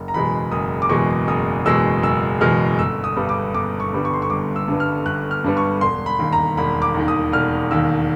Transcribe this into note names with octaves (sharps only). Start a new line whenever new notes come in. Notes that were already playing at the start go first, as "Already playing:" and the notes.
Already playing: F#1
A#5
E2 B2 G#3 B5
F#1 D#6
D6
E2 B2 G#3 C#6
F#1 D#6
E2 B2 G#3 E6
F#1 E6
E2 B2 G#3 F6
G1 E6
D#6
G2 D3 G3 B3
D6
G1 D6
C#6
G2 D3 G3 B3
C#6
C6
C#6
G1 D6
E6
G2 D3 G3 B3
F6
G1 F#6
F6
G2 D3 G3 B3
C#6
E1 C6
B5
D#2 D#3
A#5
E1 B5
D6
D#2 D#3
D#6
E1 F6
D#2 D#3 E6